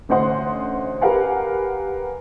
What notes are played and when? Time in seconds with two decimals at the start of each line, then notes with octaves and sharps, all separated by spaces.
0.09 A1 D2 C5 D#5 F#5 C6
1.01 G4 A#4 B4 F5 F#5 G#5